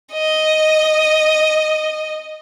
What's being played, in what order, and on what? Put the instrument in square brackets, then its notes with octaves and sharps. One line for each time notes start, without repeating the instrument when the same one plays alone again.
[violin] D#5